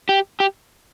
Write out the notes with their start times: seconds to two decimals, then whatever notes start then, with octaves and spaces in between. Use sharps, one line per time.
0.09 G4
0.40 G4